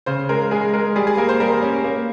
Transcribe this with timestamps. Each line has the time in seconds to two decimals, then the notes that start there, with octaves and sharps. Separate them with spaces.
0.06 C#3 C5
0.29 G#3 A#4
0.51 G#3 G#4
0.73 G#3 A#4
0.96 G3 G#4
1.07 G#4
1.17 A#3 A#4
1.29 C5
1.40 G3 A#4
1.62 C#4
1.84 A#3